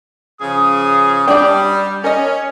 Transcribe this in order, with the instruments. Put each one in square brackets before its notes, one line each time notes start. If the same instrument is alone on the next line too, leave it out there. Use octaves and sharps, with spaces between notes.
[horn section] C#3 F3 G#4 [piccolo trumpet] D#6
[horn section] G3 [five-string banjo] D4 D5 [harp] G5 D6
[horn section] C#4 [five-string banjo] A#4 D#5